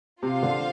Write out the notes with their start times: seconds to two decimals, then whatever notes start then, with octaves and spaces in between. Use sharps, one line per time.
0.22 C3 F4 C5 F5
0.43 D3